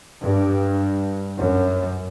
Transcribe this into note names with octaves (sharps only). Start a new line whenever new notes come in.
G2
F#2